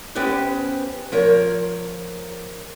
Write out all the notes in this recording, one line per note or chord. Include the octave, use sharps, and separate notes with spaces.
B3 C#4 G4 B4 C5
F3 A#4 C#5